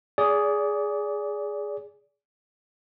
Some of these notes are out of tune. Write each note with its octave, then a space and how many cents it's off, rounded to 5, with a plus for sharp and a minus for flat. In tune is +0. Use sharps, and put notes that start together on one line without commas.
G#4 +0 D5 -25